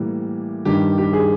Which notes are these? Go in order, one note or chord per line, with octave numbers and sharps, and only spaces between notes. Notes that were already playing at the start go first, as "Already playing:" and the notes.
Already playing: A2 E3 G3 A#3
G2 D#3 G3 G4
G4
G#4